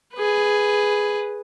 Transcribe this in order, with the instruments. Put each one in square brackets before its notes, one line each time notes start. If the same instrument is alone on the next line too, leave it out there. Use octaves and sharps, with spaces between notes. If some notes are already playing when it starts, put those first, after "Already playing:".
[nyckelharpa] G#4 B4